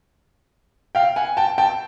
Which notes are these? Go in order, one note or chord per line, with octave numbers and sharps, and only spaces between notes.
F5 G5
F#5 G#5
G5 A5
G5 A5